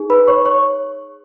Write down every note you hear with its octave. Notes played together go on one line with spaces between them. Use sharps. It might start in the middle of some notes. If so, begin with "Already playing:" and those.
Already playing: D#4 G#4
B4 B5
C#5 C#6
C#5 C#6